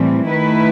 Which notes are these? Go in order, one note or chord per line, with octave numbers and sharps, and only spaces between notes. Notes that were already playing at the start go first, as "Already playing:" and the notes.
Already playing: A2 E3 G3 C4
D#3 A3 E4 B4